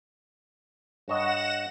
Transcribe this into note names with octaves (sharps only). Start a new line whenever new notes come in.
G2 C#5 D#5 F#5 A#6 E7